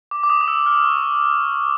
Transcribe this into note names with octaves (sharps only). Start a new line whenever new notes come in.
D6
D6
D#6
D#6
E6
F6
C#6